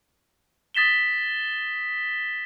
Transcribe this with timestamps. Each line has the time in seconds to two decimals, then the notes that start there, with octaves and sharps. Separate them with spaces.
0.74 D#6 A6 B6 E7 G7